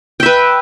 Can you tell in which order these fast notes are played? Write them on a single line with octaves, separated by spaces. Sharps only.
G5 E5 B4